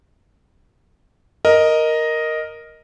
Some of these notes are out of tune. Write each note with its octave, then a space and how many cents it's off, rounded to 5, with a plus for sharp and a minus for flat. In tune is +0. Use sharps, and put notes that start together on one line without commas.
A#4 +0 D#5 +0